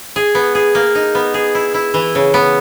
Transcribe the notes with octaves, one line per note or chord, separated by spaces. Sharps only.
G#4
B3
G#4
A#3
D#4
B3
G#4
E4
E4
E3
C#3
B3